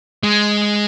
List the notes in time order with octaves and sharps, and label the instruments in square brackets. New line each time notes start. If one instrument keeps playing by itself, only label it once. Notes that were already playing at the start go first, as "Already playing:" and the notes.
[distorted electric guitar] G#3